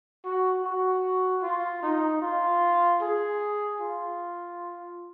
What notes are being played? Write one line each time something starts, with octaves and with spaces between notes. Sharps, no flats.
F#4
F#4
F4
D#4
F4
G#4
F4